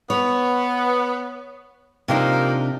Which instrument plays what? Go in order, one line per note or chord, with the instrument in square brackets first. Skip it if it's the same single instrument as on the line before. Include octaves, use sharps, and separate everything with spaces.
[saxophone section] B3 [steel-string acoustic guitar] C#5
[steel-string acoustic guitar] C3 D4 D#4 [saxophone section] F3 A#3